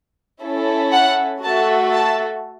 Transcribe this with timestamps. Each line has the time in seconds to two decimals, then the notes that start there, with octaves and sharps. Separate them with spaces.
0.42 C#4 E4 A4
0.92 F#5
1.43 A3 F#4 A4 A5
1.93 A5